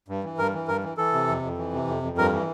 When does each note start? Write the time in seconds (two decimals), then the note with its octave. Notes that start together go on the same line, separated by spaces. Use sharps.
0.08 G2
0.24 E3
0.38 G2 A#4
0.54 E3
0.68 G2 A#4
0.84 E3
0.97 E3 A4
1.13 C3
1.28 F2
1.42 F2
1.58 E3
1.73 C3
1.88 F2
2.03 F2
2.18 G2 A#4
2.32 E3